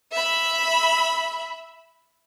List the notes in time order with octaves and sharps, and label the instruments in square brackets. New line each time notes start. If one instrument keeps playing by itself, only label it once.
[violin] E5 B5